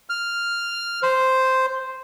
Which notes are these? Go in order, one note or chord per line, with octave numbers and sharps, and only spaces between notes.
F6
C5